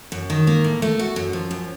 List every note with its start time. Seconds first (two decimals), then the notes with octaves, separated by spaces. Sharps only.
0.12 F#2
0.30 D#3
0.47 A#3
0.64 A2
0.82 A3
0.99 F#4
1.16 F#2
1.33 F3
1.51 F#2